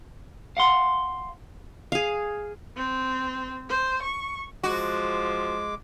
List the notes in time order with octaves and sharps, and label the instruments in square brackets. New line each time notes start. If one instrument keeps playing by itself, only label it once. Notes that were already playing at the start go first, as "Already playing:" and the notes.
[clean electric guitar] F5 F#5 C6
[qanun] G#4 F5
[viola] C4
C5
C#6
[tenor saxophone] F3 [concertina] G#3 D6 [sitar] F#4